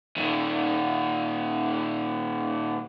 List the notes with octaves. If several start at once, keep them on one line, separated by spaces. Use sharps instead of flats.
A#2 D#3